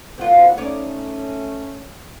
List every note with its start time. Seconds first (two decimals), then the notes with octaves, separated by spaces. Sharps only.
0.18 F#1 C2 C4 F4 F#5
0.57 A3 C#4 D#4 C#5 D5